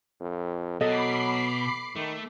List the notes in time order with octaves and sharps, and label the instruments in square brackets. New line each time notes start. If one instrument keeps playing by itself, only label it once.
[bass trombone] F2
[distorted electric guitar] B2 [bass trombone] F#3 [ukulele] A4 D#5 [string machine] B5 D6 C7
[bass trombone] D#3 [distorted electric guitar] A3